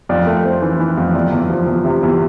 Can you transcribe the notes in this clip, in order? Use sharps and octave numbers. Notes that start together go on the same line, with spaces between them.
F2 D5
A3
C4
E3
E3
F2
E2 D5
E2
F3
E2
C3
E2